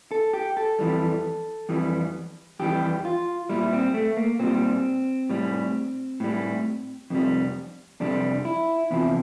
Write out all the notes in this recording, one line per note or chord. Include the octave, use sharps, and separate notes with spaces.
A4
G4
A4
F2 E3 G3
F2 E3 G3
F2 E3 G3 G4
F4
A#2 G3 E4
C4
A3
A#3
A#2 G3 C4
A2 G3
A2 G3
F2 C3 G3
F2 C3 G3 D4
E4
E2 C3 F3 E4